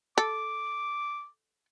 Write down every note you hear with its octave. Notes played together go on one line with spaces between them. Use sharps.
A4 D6